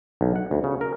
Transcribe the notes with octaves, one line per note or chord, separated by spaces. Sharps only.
B1
F#5
D2
C#3
A#4